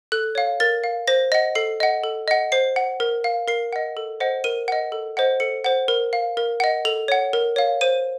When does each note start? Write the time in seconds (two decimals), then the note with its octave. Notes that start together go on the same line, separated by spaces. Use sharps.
0.12 A4 F#6
0.35 C#5 F5
0.60 A#4 A6
0.84 F5
1.07 C5 A#6
1.32 D#5 F#5 A#6
1.55 A4 C7
1.80 D#5 F#5
2.04 A4
2.28 D#5 F#5
2.52 C5 C7
2.76 F#5
3.00 A#4
3.24 F5
3.48 A#4 C7
3.73 D#5 F#5
3.97 A4
4.20 C5 D#5 F#5
4.44 A#4 D#7
4.68 D#5 F#5
4.92 A4
5.17 C5 D#5 F#5
5.40 A4 C#7
5.64 C5 F#5
5.88 A#4
6.13 F5
6.37 A#4
6.60 D#5 F#5
6.85 A4 F7
7.08 C#5 F#5
7.33 A#4
7.56 C#5 F5
7.81 C5 D#7